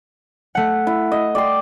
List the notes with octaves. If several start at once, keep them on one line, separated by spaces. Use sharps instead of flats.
A3 F#5
E4
D#5
D5 G5 C6